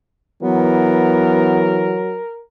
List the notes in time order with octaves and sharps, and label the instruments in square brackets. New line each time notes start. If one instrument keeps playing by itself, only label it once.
[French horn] E3 [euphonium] F#3 [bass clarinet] B3 [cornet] A#4